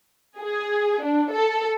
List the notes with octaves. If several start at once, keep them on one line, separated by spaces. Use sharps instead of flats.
G#4
D4
A4